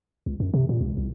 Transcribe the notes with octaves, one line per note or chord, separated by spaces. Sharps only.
C#2
F#2
C3
A#2
C#2
C2